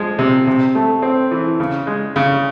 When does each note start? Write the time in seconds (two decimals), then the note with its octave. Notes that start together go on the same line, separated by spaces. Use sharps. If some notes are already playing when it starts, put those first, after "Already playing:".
Already playing: F3 G#3
0.19 C3
0.47 C3
0.75 A3
1.02 C4
1.31 E3
1.60 C#3
1.87 G#3
2.16 C#3